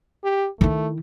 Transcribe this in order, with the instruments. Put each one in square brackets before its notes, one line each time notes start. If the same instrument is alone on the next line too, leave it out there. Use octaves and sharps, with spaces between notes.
[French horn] G4
[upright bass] D#3 E4 [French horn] A3